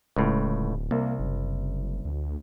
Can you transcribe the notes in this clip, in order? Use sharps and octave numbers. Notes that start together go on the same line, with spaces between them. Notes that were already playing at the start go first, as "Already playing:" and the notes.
D1 C#2 A2
C2 A#3
F#1
D2